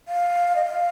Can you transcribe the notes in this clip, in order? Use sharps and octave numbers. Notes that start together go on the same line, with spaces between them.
F5
D#5
F5